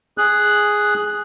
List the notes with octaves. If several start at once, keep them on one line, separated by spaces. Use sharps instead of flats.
G#4 F#6